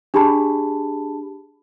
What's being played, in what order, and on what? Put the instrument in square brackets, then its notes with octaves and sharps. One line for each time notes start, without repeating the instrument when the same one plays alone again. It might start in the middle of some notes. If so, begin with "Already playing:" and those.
[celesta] D4 G4 G#4 A5 B5